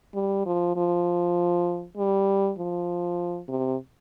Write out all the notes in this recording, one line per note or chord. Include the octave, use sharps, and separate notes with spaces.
G3
F3
F3
G3
F3
C3